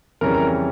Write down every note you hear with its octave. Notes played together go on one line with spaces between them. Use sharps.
F2 C#3 E3 G3 C#4 A#4 A#5
A#4 A#5